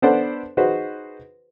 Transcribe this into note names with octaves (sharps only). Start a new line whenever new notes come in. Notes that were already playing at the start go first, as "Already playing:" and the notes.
B3 D4 A4 C5 D5 F#5
D#4 F#4 G#4 B4 C5